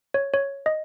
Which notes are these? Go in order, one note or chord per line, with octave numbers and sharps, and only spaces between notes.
C#5
C#5
D#5